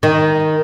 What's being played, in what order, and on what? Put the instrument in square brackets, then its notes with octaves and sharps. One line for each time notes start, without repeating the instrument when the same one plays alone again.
[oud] D#3